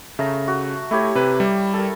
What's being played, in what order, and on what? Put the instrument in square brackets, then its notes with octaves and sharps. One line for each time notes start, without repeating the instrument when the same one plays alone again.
[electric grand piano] C#3 [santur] A3 A#5
[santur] F#4
[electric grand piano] A3 [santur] E4 G4 C#5
[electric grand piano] C3 B4
G3
[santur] A4 A#4